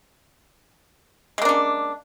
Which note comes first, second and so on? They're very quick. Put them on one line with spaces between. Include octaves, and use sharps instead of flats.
G#3 A#3 D4 C#4